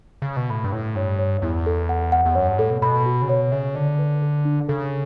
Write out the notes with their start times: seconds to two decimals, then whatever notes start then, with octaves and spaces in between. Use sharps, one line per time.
0.22 C#3
0.37 B2
0.50 A2 B5
0.64 G2
0.72 A2 E4
0.95 G2 C#5
1.19 C#5
1.42 E2 E4
1.66 A4
1.89 F#5
2.12 F#5
2.25 E2
2.35 F#2 C#5
2.48 G2
2.58 A2 A4
2.70 B2
2.82 B2 B5
3.06 F#4
3.22 C#3
3.28 B2 C#5
3.52 C#3 E5
3.75 D3 D5
3.99 B4
4.22 A4
4.45 D4
4.68 C#3 A4